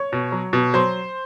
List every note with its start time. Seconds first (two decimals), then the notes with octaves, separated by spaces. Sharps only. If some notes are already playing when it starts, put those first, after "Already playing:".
Already playing: C#5 C#6
0.13 B2
0.32 F#3
0.53 B2
0.74 F#3 C5 C6